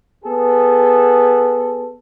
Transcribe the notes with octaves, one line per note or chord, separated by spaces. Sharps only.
B3 G#4 A4